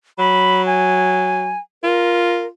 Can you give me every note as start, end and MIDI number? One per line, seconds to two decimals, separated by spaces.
0.19 1.54 54
0.19 0.65 83
0.66 1.59 80
1.83 2.48 65
1.83 2.46 70